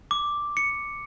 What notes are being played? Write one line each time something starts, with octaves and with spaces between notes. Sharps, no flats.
D6
C#7